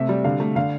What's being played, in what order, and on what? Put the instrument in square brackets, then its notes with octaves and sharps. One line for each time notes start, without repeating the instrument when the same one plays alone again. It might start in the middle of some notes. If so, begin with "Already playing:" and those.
Already playing: [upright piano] C3 A3 E5
G3
D3 F5
A3
D3 F5